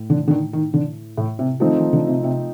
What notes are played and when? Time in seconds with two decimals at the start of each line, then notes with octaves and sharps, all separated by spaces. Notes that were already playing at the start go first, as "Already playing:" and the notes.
Already playing: A2
0.10 D3
0.27 D3
0.31 D#3
0.53 D#3
0.74 D3
1.17 A2
1.39 C3
1.60 D#3 F3 A3 C4 D#4
1.76 D#3
1.93 D3
2.08 C3
2.24 C3